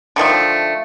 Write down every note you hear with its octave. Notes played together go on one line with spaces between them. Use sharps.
D3 D#3 F3 A3